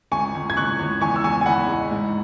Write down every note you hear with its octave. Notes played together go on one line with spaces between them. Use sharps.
C#2 G#5 C#6
C#2
G#6
C#2 C#6 F#6
C#2
E2 G#5 C#6
E6
E2 G#5 C#6
G#5
E2 F#5 B5
G#3
G#2